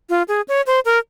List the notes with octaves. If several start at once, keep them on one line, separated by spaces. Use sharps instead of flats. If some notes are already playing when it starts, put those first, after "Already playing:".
F4
G#4
C#5
C5
A#4